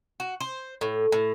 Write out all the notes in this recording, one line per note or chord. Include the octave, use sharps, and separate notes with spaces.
F#4
C5
A2
A2